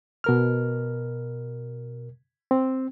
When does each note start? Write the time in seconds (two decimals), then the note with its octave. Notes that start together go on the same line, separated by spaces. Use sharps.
0.24 B2 A#4 F6
2.51 C4